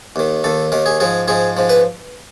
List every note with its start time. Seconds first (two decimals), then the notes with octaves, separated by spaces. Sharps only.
0.16 D#2 D#3
0.44 D#2 D#3 A4
0.72 D#2 D#3 A#4
0.86 G#4
1.00 G#2 F3 G#4
1.28 G#2 F3 G#4
1.57 G#2 F3
1.69 B4